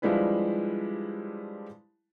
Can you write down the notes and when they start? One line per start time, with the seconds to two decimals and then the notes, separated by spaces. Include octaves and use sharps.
0.02 F3 G3 G#3 D4 E4 B4